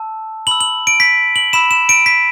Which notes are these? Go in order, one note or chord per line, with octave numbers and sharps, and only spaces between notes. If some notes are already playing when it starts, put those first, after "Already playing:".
Already playing: A5 E6
B5 E6 F#7
F#7
D7
B6
F#7
B5 E6 E7
E7
D7
B6